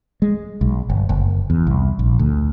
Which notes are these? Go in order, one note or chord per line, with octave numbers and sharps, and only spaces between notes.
G#3
B1
G1
F#1
E2
C2
A#1
D2